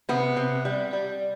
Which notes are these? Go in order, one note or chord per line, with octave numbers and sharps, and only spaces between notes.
C3 B3
C3
G3
G3